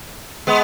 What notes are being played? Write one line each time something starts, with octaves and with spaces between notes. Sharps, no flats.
G#3 B3